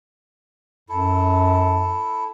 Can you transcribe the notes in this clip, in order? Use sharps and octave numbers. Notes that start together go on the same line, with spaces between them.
F#2 E4 A4